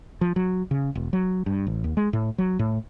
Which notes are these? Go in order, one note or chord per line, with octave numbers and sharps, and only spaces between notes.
F3
F#3
C#3
E1
F#3
G2
A1
D#2
G#3
A2
F#3
A2